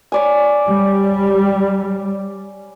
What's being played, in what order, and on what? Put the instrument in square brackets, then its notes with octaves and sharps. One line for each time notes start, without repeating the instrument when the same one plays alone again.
[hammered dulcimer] C#5 D5 G#5
[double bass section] G3